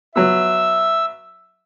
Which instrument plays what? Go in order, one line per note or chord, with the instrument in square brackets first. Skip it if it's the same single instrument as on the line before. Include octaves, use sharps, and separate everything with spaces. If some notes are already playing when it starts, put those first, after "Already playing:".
[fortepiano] F#3 B3 [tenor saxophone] E5 [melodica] E6